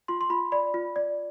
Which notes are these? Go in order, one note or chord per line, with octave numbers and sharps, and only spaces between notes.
F4 C6
C6
F4 B5
D5 B5
F4
D5